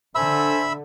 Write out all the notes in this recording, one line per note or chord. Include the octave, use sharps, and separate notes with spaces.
D3 A4 C5 E5 G#5 B5 E6